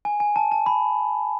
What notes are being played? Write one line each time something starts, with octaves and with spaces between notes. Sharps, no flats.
G#5
G#5
A5
A5
B5